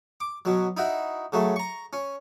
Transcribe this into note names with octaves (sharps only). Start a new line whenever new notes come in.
D6
B2 F#3
D#4 E4 F#4
C#3 F#3 A3
A#5 C#6
C#4